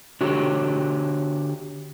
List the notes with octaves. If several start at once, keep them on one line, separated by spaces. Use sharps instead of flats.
D3 F#4 G4 C#5